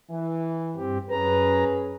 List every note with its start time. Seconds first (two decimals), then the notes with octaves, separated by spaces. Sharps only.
0.10 E3
0.76 G2 C4 G4
1.10 F#2 C#4 G#4 B4 A#5